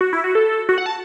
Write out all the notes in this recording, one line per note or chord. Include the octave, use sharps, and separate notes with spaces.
F#4
E4
F#4
A4
F#4
F#5
A5